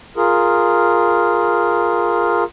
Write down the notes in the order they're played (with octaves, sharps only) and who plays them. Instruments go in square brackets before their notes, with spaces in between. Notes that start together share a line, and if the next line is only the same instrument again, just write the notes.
[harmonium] F4 G#4 A#4